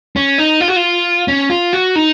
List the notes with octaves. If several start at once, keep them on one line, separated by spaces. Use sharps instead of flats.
C#4
D#4
F4
F#4
F4
C#4
F4
F#4
D#4